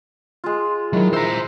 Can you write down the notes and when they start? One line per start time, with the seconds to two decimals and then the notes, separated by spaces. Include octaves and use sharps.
0.44 G#3 F4
0.93 D#3 F#3 G#3 E4
1.13 C5 E5 A#5